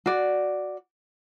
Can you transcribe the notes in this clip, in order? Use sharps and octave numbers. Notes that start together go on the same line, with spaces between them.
F#4 D5